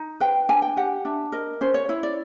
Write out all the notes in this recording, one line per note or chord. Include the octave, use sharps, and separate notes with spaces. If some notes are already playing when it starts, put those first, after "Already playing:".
Already playing: D#4
B4 G5
D4 G#5
G5
G4 F#5
D4 E5
A#4 D#5
C#4 C5
C#5
E4 C#5
D5